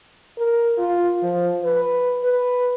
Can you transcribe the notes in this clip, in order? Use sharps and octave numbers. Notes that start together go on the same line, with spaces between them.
A#4
F4
F3
B4
B4